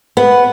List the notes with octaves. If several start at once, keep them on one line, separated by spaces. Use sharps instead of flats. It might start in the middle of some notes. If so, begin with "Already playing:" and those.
B3